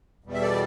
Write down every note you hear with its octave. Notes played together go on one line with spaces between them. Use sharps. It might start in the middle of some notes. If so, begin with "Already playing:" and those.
E2 B2 G3
E5
A4 D5